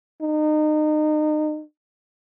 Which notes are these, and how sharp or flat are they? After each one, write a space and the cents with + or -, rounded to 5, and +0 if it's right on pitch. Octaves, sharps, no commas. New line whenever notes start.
D#4 -30